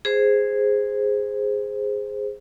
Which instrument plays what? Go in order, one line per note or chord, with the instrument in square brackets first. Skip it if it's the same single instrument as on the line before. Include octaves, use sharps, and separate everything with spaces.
[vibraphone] G#4 C5